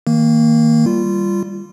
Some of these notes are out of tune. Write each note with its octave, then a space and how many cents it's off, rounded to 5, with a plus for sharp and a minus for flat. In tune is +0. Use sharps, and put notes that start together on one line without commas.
D#3 +25 A#3 -15
G3 +0 F4 -15